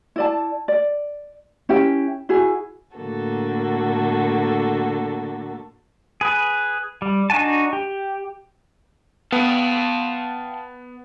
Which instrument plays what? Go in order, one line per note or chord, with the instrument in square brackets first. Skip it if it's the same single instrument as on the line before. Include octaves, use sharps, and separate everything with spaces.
[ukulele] E4 D5 A5
D5
C#4 E4 G4 G5
E4 F#4 G#4
[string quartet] A2 D3 A#3 F#4 A4
[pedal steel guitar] G#4 B4
G3
D4 D#4 F#4 G#5 A5
G4
[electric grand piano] B3 [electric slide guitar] F5 G5 A5